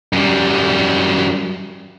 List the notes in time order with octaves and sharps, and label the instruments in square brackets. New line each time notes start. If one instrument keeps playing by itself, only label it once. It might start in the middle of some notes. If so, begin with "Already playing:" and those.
[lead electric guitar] F#2 G3